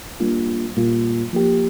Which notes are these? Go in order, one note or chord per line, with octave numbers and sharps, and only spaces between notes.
G3 A#3 D4 F4
A#2 G3 A#3 F4
F3 A#3 G4